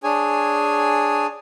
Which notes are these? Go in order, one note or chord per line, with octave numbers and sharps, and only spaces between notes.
D4 G#4 C#5 G#5